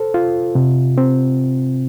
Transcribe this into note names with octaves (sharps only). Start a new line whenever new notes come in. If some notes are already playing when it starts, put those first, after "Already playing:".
Already playing: A4 C5
F4
C3
C4